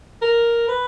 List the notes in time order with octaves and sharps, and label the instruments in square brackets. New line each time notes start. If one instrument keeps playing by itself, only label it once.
[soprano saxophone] A#4
B4